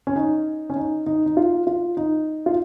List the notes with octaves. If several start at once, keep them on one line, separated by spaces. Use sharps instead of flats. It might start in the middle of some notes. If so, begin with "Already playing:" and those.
C#4
D#4
C#4
D#4
D#4
D#4
F4
F4
D#4
F4